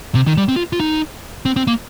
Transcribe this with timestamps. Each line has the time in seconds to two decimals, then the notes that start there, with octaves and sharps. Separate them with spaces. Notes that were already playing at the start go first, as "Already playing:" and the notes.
0.15 C3
0.27 D#3
0.37 G3
0.48 C4
0.56 F4
0.73 F4
0.80 D#4
1.45 C4
1.56 C4
1.67 A#3